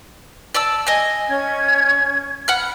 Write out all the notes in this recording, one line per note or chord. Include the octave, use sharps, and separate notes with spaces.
D5 A5 E6
D#5 G#5
C#4 G#6
F#5 B5 F6